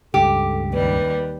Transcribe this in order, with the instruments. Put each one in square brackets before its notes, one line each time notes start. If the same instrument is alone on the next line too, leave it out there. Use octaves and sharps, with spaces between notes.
[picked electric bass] C#2 G2 C#3 [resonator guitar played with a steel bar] G4 [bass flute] A4
[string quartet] D#2 G3 [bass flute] B4